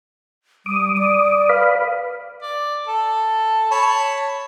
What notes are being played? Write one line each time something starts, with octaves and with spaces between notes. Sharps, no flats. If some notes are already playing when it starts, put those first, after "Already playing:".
G3 D6 D#6
D5
B4 F5 B5
D5
A4
C#5 A5 B5